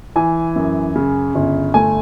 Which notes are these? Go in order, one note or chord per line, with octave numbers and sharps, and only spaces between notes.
E3 G#5
F#2
C#3
G1
A3 G#5